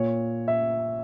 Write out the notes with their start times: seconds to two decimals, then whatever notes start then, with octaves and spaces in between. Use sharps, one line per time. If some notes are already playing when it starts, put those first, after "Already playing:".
Already playing: A#2 C#5
0.48 E5